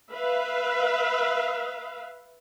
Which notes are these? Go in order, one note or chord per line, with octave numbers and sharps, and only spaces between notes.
B4 E5 F5